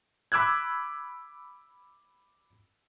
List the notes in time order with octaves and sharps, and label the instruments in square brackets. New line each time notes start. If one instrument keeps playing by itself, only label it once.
[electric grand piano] B5 D6 E6 F#6 G#6